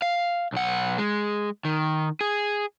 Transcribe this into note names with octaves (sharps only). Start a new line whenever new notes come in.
F5
B1 F#5
G#3
D#3
G#4